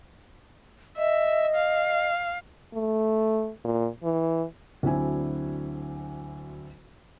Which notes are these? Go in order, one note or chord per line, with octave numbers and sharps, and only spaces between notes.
D#5 E5
F5
A3
A#2
E3
D2 F#3 C4 D4 E4 G#5